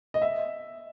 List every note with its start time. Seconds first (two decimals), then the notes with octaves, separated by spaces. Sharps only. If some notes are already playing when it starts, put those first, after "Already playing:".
0.14 D#5
0.22 E5